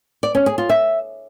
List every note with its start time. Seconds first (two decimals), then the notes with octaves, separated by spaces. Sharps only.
0.23 D5
0.35 C#4
0.46 G#4
0.58 F4
0.70 E5